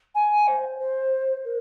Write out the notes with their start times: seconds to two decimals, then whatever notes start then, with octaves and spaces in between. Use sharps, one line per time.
0.15 G#5
0.47 C5
0.79 C5
1.45 A#4